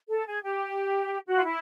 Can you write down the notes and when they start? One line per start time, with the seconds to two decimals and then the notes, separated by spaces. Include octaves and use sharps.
0.09 A4
0.26 G#4
0.43 G4
1.27 F#4
1.36 F4
1.44 E4